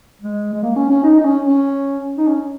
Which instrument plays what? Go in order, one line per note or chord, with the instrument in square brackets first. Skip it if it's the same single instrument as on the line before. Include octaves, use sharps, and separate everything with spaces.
[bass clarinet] G#3
G#3
A#3
C#4
C#4
D#4
D#4
C#4
C#4
D#4
C#4